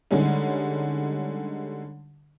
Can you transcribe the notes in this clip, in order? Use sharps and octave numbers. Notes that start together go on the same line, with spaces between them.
D3 G3 G#3 C#4 D#4